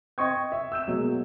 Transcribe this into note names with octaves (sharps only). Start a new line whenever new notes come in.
D#5 G5 C6 C#6 D#6 G#6
E5
E6 G6 E7
B2 F#3 G#3 A#3